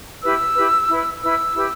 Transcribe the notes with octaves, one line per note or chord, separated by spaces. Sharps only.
E4 G4 B4 E6
E4 G4 B4
E4 B4
E4 B4 E6
E4 G4 B4